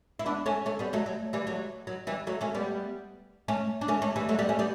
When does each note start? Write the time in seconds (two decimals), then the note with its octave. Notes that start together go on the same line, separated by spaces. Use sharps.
0.19 E4
0.26 B3 D4
0.46 A3 C#4
0.66 A3 C#4
0.79 G3 B3
0.93 F#3 A3
1.06 F#3
1.33 E3 G3
1.47 F#3 A3
1.87 F#3
2.07 E3 G3
2.27 F#3 A3
2.41 A3 C#4
2.55 G3 B3
3.48 A3 C#4
3.81 D4
3.88 A3 C#4
4.02 A3 C#4
4.16 E3 G3
4.29 F#3 A3
4.39 G3 B3
4.49 A3 C#4
4.59 G3 B3